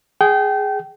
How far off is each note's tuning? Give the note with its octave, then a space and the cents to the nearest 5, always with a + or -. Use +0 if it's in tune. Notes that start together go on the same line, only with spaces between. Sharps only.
G#4 +0 G5 -30